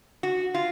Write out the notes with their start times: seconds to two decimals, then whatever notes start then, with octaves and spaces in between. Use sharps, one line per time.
0.23 F#4
0.54 F4